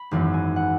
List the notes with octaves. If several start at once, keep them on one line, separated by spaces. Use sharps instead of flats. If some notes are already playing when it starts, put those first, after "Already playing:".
Already playing: B5
G#1 F#2 E3 B3
G#5
F#5